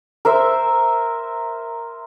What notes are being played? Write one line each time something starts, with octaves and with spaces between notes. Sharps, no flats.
A#4 C5 E5